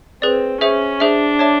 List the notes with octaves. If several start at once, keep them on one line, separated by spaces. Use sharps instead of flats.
C4 G#4 B4 D5
C#4 G#4 C5 E5
D4 G#4 C5 E5
C#5 E5 A5 D6